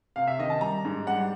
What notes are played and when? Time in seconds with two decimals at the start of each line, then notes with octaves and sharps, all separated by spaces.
0.16 C3 F5
0.27 E5
0.39 D#3 D#5
0.50 A5
0.61 G3 A#5
0.85 G#2
1.07 G3 F#5